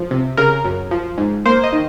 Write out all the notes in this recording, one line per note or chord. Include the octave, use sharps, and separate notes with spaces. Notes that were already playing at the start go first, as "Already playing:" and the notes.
Already playing: F3
C3
C#3 A#4
F#2
F3
G#2
A#3 C5
D#5
D#3